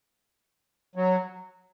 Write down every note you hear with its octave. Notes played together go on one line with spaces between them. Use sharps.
F#3